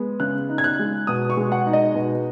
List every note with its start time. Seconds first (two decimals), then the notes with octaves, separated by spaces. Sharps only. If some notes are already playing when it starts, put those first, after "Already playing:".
Already playing: G#3 B3
0.20 C#3 F#6
0.49 D#4
0.58 G#6
0.64 F#6
0.79 G#3
1.07 B2 D#6
1.30 C#6
1.37 G#3
1.52 F#5
1.67 D#4
1.73 D#5
1.95 B2